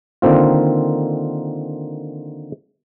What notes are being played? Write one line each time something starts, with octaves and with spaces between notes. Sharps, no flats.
D3 D#3 A#3 C4 F4